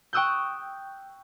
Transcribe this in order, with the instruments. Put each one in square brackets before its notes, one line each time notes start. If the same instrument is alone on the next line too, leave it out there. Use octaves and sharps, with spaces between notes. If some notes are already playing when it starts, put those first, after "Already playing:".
[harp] G5 C#6 D#6 E6 F#6 G6